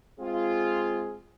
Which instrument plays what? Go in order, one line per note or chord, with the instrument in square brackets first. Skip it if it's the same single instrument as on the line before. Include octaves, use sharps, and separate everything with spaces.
[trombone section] G#3 C4 G#4 [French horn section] F4